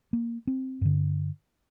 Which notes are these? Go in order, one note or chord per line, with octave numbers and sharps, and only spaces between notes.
A#3
C4
G2 D3